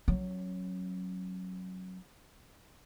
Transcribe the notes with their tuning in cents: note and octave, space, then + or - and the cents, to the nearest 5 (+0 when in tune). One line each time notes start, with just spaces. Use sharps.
F#3 +0 C#4 -30